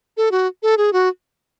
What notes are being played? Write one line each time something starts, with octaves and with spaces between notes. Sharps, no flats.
A4
F#4
A4
G#4
F#4